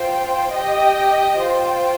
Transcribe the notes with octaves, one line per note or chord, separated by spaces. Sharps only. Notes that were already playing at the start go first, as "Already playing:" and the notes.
Already playing: F4 C5 G5
G4 D#5 G5
F4 C5 G5